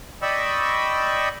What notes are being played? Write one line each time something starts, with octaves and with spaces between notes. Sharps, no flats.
D5 D#5 G5 B5 C#6 E6